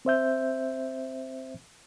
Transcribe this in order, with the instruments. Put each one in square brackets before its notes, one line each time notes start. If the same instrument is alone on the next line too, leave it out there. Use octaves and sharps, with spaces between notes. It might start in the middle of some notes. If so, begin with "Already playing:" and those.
[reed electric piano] C4 C5 E5 G6